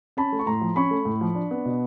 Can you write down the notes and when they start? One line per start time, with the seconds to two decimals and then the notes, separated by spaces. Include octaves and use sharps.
0.17 C#4 A5 B5
0.32 A3
0.39 C#6
0.46 A2 A#5 C6
0.61 F3
0.76 C#4 B5 C#6
0.91 A3
1.05 A2
1.21 F3
1.35 D4
1.51 B3
1.65 B2